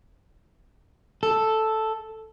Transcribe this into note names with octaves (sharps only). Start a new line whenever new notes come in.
A4